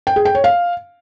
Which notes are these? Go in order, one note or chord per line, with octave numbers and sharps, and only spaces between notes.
G5
G#4
G5
C#5
F5